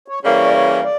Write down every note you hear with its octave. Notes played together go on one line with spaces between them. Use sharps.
C#5
C#3 E3 G3 A#3 C#5
D5
C#5
D5